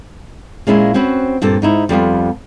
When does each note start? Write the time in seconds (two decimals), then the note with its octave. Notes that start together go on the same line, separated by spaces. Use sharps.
0.67 A#2 G#3 C#4 E4 F4
0.94 C4 C#4 F#4 B4
1.42 G2 A#2 C4 A4
1.62 G#2 D#4 E4
1.89 F2 G3 B3 F4